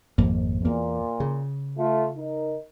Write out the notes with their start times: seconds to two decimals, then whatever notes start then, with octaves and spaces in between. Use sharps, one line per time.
0.18 G#1 F2 A#3
0.65 E2 A#2 A#3
1.20 C#3
1.77 A3 F4
2.16 D#4 A#4